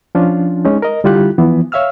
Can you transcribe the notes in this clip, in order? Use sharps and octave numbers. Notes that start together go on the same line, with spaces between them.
F3 C#4 D4 F4
G#3 C#4 D#4
A#4 D#5
D3 G3 E4 F4 G4 F#6
E3 F3 B3
C#5 E5 F5 E6 F6